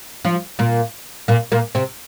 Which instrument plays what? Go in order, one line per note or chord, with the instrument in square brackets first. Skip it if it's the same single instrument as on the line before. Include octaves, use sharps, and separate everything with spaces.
[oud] F3 F4
A#2 A#3
A#2 A#3
A#2 A#3
C3 C4